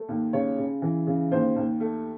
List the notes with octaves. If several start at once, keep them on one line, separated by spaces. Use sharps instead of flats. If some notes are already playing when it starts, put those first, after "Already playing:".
Already playing: A3
D#2
C#3 C#5
C#3
E3
C#3
D#2 C5
D#2
A3